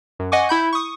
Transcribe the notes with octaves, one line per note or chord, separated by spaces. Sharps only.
F#2
D#5 F#5 G#5 C#6 D6
E4 B5 G6
C#6 D#6